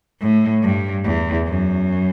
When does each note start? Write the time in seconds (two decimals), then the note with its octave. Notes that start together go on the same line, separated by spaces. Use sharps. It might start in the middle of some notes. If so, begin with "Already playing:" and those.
0.20 A2
0.62 G2
1.04 E2
1.46 F#2